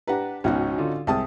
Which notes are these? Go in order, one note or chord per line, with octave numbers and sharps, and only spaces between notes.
D4 G4 B4 F#5 A#5
G#1 C#2 B2 C#4 D#4 F#4
D3 F4
C2 G#3 C4 G5 A5 D#6